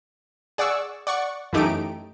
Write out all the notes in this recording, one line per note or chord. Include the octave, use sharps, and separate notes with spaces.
G#4 D5 F#5 C#6 E6
D5 F#5 C#6
F#2 E3 A3 D#4 G4 D7